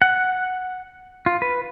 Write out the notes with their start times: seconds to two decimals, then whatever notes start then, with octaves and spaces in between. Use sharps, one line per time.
0.02 F#5
1.26 F4
1.42 B4